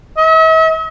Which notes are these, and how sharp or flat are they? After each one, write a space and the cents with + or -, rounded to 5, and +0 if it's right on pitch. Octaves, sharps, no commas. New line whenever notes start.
E5 -45